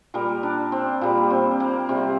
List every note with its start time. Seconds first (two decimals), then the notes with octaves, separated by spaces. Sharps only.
0.14 A#2 G3 A#4
0.43 D4
0.72 C4
1.01 A#2 G3 A#3
1.30 C4
1.60 A#3
1.89 C3 G3 C4